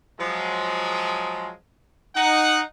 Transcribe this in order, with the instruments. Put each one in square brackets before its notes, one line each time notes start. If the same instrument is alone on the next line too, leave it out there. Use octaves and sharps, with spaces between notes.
[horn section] F3 F#3 G#3
D#4 F#5